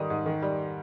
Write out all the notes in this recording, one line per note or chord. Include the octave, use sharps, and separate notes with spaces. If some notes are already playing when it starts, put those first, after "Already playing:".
Already playing: G#2 D#3 G3 D#6
G#2
D#3
G3